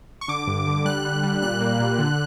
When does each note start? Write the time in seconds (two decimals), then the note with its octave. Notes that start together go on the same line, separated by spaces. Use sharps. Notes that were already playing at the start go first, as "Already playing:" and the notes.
0.21 C#6
0.28 D3 D6
0.47 G2
0.67 D3
0.85 G3 F#6
1.05 G3
1.23 G3
1.42 A#2 F#6
1.61 A#3
1.80 A#2
1.99 D3